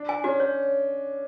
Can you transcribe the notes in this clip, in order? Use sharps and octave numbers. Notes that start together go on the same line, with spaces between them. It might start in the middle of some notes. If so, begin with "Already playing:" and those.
Already playing: D4
G#5
C#4 F#4
C#5